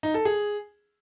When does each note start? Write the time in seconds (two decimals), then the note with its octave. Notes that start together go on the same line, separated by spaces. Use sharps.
0.03 D#4
0.14 A4
0.25 G#4